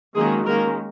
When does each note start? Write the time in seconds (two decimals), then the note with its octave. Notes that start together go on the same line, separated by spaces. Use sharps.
0.15 D#3 F#3 G#3 A#3 C#4 G#4
0.46 D#3 G#3 A#3 C#4 A#4